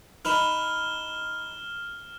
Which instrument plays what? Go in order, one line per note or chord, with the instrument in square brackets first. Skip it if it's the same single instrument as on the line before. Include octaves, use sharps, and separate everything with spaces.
[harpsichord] D#4 B4 B5 [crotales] F6 E7 G7